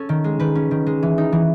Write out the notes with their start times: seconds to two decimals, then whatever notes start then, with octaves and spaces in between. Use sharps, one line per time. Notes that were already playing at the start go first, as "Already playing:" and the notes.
Already playing: C#4 A4
0.09 D#3
0.24 G#3
0.39 D#3 B4
0.55 C#4
0.71 D#3
0.87 G#3
1.03 E3
1.18 D#4
1.32 E3